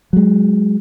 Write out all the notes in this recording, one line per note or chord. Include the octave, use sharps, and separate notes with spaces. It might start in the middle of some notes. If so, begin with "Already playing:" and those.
F#3 G#3